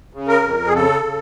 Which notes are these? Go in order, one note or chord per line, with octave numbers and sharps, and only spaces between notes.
C#3
A#4
F2
G#4
C#3 A4
C#3